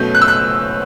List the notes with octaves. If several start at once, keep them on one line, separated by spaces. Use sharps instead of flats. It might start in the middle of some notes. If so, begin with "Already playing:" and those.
Already playing: B2 F#3 A3 C#4 G6
F#6
E6
F#6